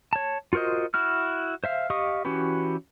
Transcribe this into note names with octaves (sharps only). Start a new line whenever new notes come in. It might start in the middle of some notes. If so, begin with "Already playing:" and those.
C#5 A5
F4 F#4 A#4 C5 D#5
E4 F#4 F6
C5 E5 F5
G4 D#5 F5 C#6 D#6
E3 C#4 F#4 G4 B4